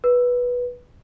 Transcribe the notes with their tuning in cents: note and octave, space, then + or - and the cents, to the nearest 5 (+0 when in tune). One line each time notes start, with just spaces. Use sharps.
B4 -10